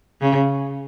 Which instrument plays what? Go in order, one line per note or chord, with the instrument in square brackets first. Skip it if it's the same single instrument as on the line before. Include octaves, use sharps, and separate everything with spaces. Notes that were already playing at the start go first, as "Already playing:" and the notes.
[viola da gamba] C#3